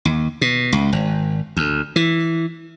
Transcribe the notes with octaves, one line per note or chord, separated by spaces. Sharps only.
D#2
B2
C#2
G#1
D2
E3